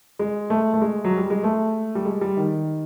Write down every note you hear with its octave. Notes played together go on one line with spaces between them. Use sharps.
G#3
A3
A3
G#3
F#3
G3
G#3
A3
G3
G#3
G3
D#3